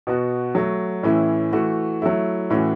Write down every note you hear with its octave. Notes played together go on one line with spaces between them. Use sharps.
B2 B3 F#4
F#3 A3 F#4
A2 E3 C#4 E4
E3 A3 F#4
F#3 A3 E4
A2 E3 C#4 F#4